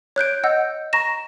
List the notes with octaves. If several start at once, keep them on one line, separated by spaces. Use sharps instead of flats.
C#5 F#6 G6 D7
D#5 F#5 E6 G6
A#5 C#6 A#6 E7